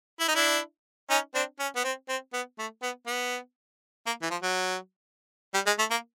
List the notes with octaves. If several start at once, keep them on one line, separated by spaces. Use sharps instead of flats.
E4
D#4
D4 E4
C#4 D#4
C4 D4
C#4
B3
C4
C4
B3
A3
B3
B3
A#3
E3
F3
F#3
G3
G#3
A3
A#3